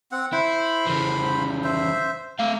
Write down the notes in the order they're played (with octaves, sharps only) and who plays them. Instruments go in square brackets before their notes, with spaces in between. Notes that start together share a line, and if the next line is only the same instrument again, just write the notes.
[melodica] C4 F#5
[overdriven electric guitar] E4 [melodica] C5 B5
[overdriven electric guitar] C#3 E3
[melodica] C5 E5
[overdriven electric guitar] A3 F5 [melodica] E5